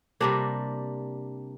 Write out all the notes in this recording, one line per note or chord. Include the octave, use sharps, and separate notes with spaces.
C3 G3 A#3 D4